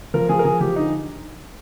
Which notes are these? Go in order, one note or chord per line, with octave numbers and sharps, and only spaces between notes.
F3 A#4
F3 G#4
A#4
F3 G#4
F3 G4
D3 D#4